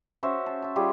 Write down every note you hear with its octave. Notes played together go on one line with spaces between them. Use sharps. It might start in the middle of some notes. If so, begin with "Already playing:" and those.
C#4 F#4 C5 E5
A5
E5 A5
G3 F4 G4 G#4